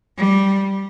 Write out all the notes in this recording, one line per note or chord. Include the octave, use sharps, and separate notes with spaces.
G3